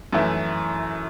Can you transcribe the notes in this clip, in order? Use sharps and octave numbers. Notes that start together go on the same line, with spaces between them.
F#2 E3 A3 E4